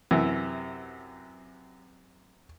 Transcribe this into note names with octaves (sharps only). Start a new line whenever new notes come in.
F#2 C3 E3